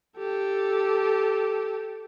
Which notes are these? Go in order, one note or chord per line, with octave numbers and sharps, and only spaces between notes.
G4 A4